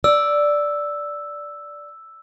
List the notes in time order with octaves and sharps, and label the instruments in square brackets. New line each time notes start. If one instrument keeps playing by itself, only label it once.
[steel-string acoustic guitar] D5 [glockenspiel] E6